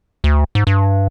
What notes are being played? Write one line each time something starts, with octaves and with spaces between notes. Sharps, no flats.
D2
G#2
G2